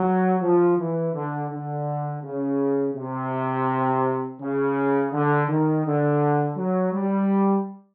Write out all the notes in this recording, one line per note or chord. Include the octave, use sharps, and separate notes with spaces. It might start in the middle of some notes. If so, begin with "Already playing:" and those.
Already playing: F#3
F3
E3
D3
D3
C#3
C3
C#3
D3
D#3
D3
F#3
G3